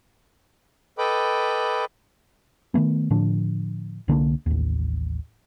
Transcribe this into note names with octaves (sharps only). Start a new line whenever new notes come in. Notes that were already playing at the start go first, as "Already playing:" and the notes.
A4 B4 D#5 G5 B5 D6
D#3 F3 A3 B3
A2 D3 F3 D4
C2 D3 A#3 D4
A1 D#2